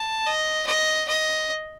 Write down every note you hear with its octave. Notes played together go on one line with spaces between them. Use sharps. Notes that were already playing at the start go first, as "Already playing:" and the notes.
Already playing: A5
D#5
D#5
D#5